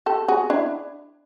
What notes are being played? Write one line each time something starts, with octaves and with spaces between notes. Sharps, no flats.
G4 A4
F#4 G#4
D4 E4